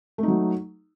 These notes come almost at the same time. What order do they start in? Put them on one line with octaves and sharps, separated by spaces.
A3 D#4 F#3